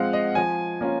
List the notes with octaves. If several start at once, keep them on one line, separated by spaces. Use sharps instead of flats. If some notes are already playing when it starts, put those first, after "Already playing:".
Already playing: F3 G#3 C4 F5 F#5
D#5
F3 G#5
A#3 C#4 F4